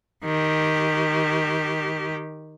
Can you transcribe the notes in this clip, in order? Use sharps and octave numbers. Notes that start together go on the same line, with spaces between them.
D#3 G4